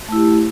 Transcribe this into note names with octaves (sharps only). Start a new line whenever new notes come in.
A3 E4 G4